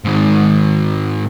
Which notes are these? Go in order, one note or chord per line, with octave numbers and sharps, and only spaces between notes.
G#2 D#3